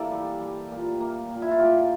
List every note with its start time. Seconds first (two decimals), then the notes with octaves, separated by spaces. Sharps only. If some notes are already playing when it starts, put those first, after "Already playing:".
Already playing: E3 A#3 G4 A4 D5 E5 G5
0.11 G3
0.41 G3
0.72 A#2
1.01 A#3
1.31 A#2
1.42 E4
1.51 F4
1.60 A#2 G4